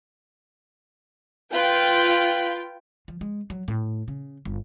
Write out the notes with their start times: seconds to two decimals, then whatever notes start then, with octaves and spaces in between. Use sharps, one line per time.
1.54 F4 B4 G5
3.08 F3
3.21 G#3
3.50 F#3
3.68 A2
4.08 C#3
4.45 G1